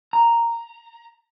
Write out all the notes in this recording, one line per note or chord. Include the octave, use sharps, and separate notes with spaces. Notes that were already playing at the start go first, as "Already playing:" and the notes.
A#5